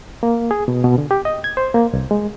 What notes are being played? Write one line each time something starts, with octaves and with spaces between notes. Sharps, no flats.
A#3
G#4
B2
B2
D3
G4
D#5
G#6
C5
A#3
C2
G#3